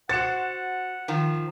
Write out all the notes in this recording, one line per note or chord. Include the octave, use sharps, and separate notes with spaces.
F#4 C5 F#5 A6 C#7 E7
D#3 F3